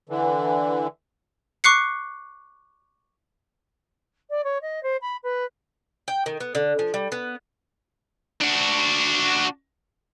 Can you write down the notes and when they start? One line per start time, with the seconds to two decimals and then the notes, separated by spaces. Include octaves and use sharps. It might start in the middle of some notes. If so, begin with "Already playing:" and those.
0.09 D3 E3
1.64 C#6 D6 F#6 C7 C#7
4.30 D5
4.44 C#5
4.61 D#5
4.83 C5
5.01 B5
5.23 B4
6.08 G5
6.26 D#3
6.40 B3
6.55 D3
6.79 F3
6.94 G3
7.12 B3
8.41 D4 F#4